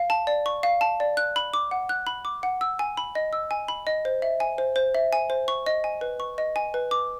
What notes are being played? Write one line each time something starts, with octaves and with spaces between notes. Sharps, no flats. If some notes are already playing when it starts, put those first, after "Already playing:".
Already playing: F5
A5
D5
C#6
F5
A5
D5
F#6
B5
D6
F#5
F#6
B5
D6
F#5
E6
G#5
B5
D#5
E6
G#5
B5
D#5
C5
E5
G#5
C5
C5
E5
G#5
C5
C#6
D#5
G#5
B4
C#6
D#5
G#5
B4
D6